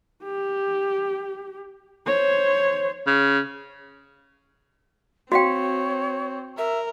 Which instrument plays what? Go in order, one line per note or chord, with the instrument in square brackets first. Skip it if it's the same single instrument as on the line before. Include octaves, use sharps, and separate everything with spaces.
[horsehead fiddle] G4
C5 C#5
[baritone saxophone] C#3
[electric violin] C4 [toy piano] F#4 F5 G5 [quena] C#5
[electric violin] A#4 [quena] E5